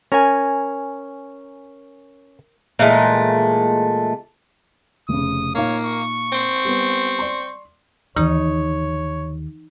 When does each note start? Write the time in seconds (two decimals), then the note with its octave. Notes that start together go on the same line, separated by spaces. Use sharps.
0.12 C#4 A#4 G#5
2.79 A#2 E3 G#3 A3
5.09 F1 C#3 D#6
5.55 A#2 A#3 D#4 C#5 F5
5.85 C#6
6.32 C4
6.65 G3 B3
7.19 D5 C6
8.16 D#2 D3 E3 D#4 C#5